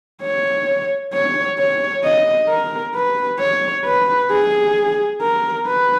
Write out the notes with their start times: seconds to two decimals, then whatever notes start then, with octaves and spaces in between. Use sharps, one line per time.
0.22 C#5
1.14 C#5
1.59 C#5
2.04 D#5
2.49 A#4
2.95 B4
3.40 C#5
3.86 B4
4.31 G#4
5.22 A#4
5.67 B4